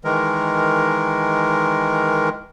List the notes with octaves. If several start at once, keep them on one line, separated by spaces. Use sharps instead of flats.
D#3 E3 G#3 A#4